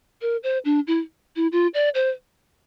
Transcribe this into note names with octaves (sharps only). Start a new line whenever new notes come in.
A#4
C5
D4
E4
E4
F4
D5
C5